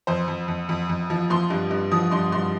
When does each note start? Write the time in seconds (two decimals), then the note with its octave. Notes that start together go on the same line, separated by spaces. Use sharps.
0.07 F2 C5
0.28 F2
0.48 F2
0.69 F2
0.89 F2
1.10 F3
1.30 F3 C6
1.50 G2
1.71 G2
1.91 F3 D#6
2.11 G2 C6
2.32 G2 C6